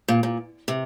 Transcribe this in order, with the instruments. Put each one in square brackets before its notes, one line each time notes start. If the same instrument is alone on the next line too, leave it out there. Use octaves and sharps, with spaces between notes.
[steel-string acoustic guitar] A#2
A#2
C3